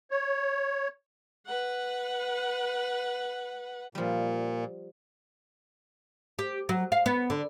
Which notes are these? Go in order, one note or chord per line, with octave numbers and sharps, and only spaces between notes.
C#5
B4 F#5
A#2 F3 G3
G4
F#3
F5
B3
D3